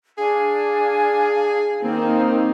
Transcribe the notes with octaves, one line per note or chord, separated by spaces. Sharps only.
D4 G#4 F5 G#5
D#3 A#3 C4 D#4